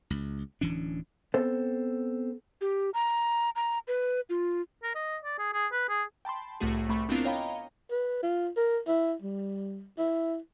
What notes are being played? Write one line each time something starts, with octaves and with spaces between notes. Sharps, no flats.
C#2
D1 E3 C#4 D4
B3 C4 A4 C5
G4
A#5
A#5
B4
F4
A#4
D#5
D5
G#4
G#4
B4
G#4
G5 A5 B5 C6
C2 A2 A3 F#4 G#4
C2 C3 A3 B5 C#6
B3 C4 D4 E4 F4 A#4
C#5 D#5 F5 G5 A#5 B5
B4
F4
A#4
E4
G3
E4